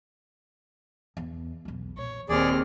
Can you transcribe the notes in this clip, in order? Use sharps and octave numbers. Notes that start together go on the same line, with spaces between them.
E2
B1 E2
A#2 C#5
D#1 D#2 C4 G#4 D5 F6